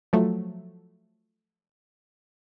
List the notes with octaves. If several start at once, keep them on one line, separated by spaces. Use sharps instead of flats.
F3 F#3 A3